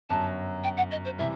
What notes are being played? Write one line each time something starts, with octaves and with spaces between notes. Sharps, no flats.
G1 F#2 F#3 A5
G5
F#5
D#5
C5
C3 E3 G3 E5